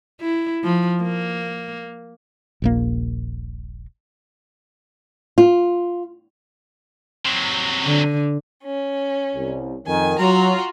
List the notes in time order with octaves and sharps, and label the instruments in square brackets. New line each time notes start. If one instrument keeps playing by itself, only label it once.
[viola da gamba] E4
F3
A#3
[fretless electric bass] D#1 A#1 A#3
[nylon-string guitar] F4
[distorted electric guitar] C3 F#3
[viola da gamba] D3
[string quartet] C#4
[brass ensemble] C2
[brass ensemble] F2 D#3 [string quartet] G#5
[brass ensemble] F#3 [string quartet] F4 F#4 A#5